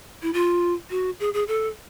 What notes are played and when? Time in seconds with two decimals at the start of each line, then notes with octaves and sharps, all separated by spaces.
0.22 E4
0.33 F4
0.90 F#4
1.20 G#4
1.34 G#4
1.48 A4